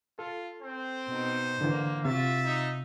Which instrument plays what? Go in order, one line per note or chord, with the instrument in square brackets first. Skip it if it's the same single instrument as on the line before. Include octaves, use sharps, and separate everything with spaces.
[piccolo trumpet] F4 [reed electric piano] A4
[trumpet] C4 [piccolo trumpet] C5
[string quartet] B2 D#4
[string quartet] G#2 A#3 [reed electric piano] D3 E3
[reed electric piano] C3 [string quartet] F4 F#4 A6 [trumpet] E5
[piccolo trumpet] D#4